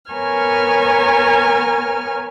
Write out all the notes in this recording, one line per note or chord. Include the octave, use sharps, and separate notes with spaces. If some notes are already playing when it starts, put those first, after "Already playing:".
B3 A#4 C#5 G#5 F6 G#6